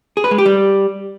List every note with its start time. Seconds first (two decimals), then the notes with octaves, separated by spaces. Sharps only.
0.17 G#4
0.24 B4
0.31 G#3
0.38 G4
0.46 G3